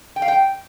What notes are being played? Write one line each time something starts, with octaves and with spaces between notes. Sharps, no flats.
G5
F5
G5